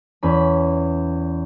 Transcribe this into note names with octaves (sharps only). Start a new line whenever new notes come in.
E2 C#4 B5